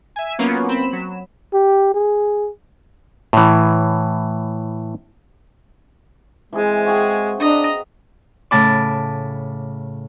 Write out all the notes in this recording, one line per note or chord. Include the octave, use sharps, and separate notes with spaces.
E5 G#5
F#3 A#3 B3 C#4 F4
C4 B5 E7
F#3
G4
G#4
A2 E3
E3 G#3 C4 G#4
F#4 G#4 F5 G5
D4 B4 D#5 A#5
A2 C#3 A5 B5 D6